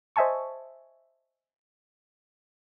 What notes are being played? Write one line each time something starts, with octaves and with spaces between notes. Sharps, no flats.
C5 D#5 E5 G#5 A5 C#6